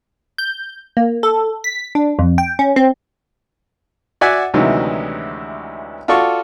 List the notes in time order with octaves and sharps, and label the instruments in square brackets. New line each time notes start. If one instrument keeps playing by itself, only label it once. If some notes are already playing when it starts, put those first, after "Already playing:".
[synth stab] G6
A#3
A4
B6
D4
F2
G5
C#4
C4
[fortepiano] F#4 D5 E5 F#5 G#5
D2 C3 D#3 E3 F#3 G#3
F4 F#4 A4 D5 C#6